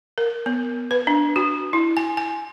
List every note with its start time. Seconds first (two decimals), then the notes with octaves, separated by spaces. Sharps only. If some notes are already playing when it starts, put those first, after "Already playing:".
0.18 A#4
0.46 B3
0.91 B4
1.07 D4
1.36 F#4
1.73 E4
1.97 G#5
2.17 G#5